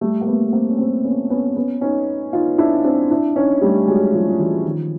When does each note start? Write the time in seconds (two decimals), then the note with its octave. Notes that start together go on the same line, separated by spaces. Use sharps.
0.01 G3 A3
0.21 A#3
0.27 A3 B3
0.47 B3
0.52 A#3 C4
0.69 C#4
0.78 A#3 C4
1.04 B3 C#4
1.30 B3 C#4
1.56 B3 C#4
1.81 C#4 D#4
2.33 D#4 F4
2.58 D4 E4
2.84 C4 D4
3.11 D4 E4
3.36 C#4 D#4
3.61 G3 A3
3.88 F#3 G#3
4.13 F3 G3
4.28 F3
4.39 E3 F#3
4.64 D#3 F3